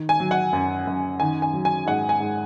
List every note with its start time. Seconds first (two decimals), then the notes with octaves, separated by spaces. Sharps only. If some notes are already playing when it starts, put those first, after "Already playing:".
Already playing: D#3
0.09 G#5
0.20 F#3
0.31 F#5
0.53 F#2
0.87 F#2
1.20 D#3 G#5
1.42 G#5
1.53 F#3
1.65 G#5
1.86 G#2 F#5
2.09 G#5
2.20 G#2